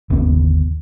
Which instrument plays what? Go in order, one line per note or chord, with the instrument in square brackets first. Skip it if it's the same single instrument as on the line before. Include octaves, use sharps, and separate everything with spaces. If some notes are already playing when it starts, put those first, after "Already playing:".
[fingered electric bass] G1 D#2 C#3 B3